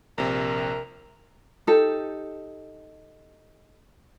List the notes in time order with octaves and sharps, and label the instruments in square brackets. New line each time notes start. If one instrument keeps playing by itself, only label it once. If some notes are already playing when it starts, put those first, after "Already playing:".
[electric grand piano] A#1 C3 [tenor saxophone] A#4
[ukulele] D#4 G4 A4